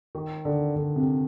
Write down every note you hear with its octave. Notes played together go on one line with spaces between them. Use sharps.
D#3
D3
D3
C3